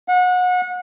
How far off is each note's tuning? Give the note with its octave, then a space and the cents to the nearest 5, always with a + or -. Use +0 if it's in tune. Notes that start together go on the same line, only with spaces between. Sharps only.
F#5 -30